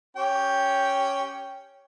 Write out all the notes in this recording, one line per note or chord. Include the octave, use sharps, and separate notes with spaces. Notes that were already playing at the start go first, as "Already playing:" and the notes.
C#4 G4 G5